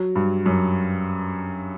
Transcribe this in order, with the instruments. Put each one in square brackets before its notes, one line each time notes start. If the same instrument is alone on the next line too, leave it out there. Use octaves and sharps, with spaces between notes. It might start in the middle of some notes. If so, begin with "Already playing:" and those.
Already playing: [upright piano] F#3
G2
F#2